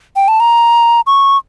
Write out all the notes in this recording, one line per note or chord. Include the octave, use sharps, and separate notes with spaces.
G5
A5
A#5
C#6